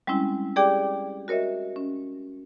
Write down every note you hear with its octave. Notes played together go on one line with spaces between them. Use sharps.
G3 G#3 C4 C#4 E4
G4 G#4 D5 G5 D6
F#4 A#4 C#5 D#5 E5
C#4